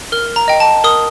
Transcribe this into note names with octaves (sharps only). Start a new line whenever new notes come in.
A#4 F6
A#5
D#5 G5
A5
A#4 D#6